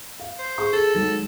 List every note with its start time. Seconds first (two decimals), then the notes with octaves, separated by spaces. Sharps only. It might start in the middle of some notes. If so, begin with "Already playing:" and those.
0.20 F5
0.39 C5
0.58 G#4 C#6
0.73 G#4 A4
0.94 D#3 F#3 G#3